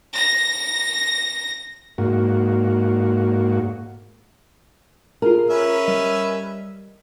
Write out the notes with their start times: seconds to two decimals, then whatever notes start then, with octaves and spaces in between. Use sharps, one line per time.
0.16 A#6
1.98 G#2 A#3 F#4
5.22 F4 G#4 A#4
5.50 C#4 B4 E5
5.84 G3 D#5 B6